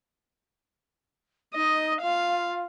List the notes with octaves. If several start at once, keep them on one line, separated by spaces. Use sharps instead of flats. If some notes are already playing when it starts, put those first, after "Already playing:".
D#4 D#5
F4 F5